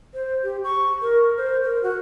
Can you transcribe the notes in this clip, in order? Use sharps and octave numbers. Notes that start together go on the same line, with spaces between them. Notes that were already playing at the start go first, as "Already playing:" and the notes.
C5
G4
C#6
A#4
C5
A#4
F#4